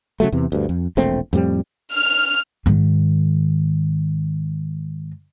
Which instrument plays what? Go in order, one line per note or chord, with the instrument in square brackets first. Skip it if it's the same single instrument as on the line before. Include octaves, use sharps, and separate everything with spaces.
[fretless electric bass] C#3 F#3 A3
E2 C3 E3
D2 G2
F2
E1 A#1 A3 C4
F2 A2 G3 C4
[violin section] F6
[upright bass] G#2 D#3